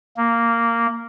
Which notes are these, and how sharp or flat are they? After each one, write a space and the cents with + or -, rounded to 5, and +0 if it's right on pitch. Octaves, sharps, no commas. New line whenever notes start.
A#3 -10